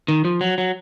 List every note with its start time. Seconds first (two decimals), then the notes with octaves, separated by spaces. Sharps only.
0.08 D#3
0.25 F3
0.41 F#3
0.58 F#3